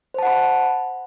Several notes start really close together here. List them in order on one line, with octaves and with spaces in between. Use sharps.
C5 A5 F#5 B5